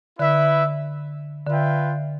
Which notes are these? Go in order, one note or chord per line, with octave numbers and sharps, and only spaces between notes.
D3 E4 B4 E5
D3 F4 B4 E5 G5